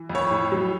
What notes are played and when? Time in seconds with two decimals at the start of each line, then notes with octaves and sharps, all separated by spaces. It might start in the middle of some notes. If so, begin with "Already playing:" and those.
Already playing: E3
0.10 F2
0.15 C#5
0.31 A2
0.52 F#3